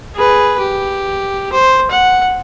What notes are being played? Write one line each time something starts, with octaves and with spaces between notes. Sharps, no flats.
G#4 B4
G4
C5
F#5